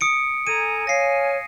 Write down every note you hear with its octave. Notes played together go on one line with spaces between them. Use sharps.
D#6 C#7 D7
A4 G#5 A#5 D#7
C#5 F5 G#5 A#6 C7